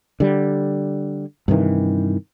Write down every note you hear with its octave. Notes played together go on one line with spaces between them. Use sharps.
D3 G3
G2 C3 D#3 E3